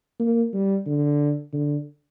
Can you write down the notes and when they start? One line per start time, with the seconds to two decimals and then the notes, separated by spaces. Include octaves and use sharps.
0.20 A#3
0.53 G3
0.86 D3
1.53 D3